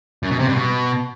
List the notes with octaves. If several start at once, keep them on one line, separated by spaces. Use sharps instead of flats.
F#2
B2
C3
G2
B2